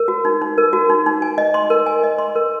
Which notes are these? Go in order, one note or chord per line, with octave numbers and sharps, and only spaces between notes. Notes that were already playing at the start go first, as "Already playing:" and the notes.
Already playing: A#4
F#4
D#4
D#4
A#4
F#4
D#4
D#4
G#5
D#5
C6
A#4
G#5
D#5
C6
A#4